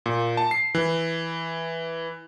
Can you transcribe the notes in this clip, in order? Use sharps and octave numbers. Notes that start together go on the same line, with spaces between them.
A#2
A5
C7
E3